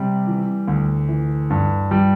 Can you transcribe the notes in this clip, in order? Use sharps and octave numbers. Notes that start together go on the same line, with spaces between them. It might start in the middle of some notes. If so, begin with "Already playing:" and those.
Already playing: C3 G3
E3
D2
E3
G2
G3